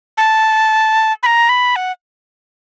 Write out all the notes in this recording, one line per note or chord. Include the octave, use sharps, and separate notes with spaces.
A5
B5
A#5
B5
F#5